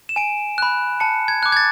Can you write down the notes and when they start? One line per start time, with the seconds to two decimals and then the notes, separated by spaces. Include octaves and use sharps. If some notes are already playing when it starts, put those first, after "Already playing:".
0.09 E7
0.16 G#5 D7
0.58 B5 F#6
1.00 A5 C#7
1.28 G#6
1.43 D6 F#6
1.52 G#6
1.57 A6